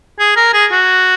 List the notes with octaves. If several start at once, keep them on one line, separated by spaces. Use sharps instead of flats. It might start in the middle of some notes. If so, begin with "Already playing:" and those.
G#4
A#4
G#4
F#4